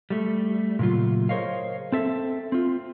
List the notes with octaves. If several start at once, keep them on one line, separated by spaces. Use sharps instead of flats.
G3 A3
A#2 C#3 F#3 A3 F4
G#4 A#4 C5 C#5 D#5 F5
C4 A4 E5
C4 F4